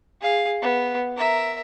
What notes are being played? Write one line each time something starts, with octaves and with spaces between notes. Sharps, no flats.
G#4 F5
B3
A#4 E5